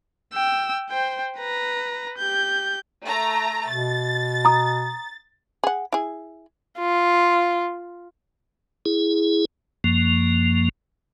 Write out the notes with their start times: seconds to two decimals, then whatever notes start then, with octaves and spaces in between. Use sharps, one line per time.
0.34 G5 E6
0.90 C5 G5
1.38 B4 A#5
2.18 G4 G6
3.04 A3 A#5
3.68 B2 A6
4.45 A#5 D#6
5.64 G#4 F#5
5.92 E4 G#4
6.79 F4
8.86 E4 G#4
9.84 F#2 F3 A#3